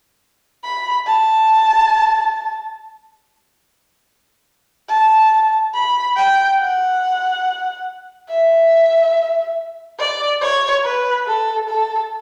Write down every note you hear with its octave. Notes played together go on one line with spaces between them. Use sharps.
B5
A5
A5
B5
G5
F#5
E5
D5
C#5
B4
A4
A4